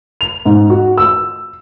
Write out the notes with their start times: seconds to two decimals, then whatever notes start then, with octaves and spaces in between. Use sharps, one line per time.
0.21 F7
0.45 G#2
0.70 F#4
0.98 E6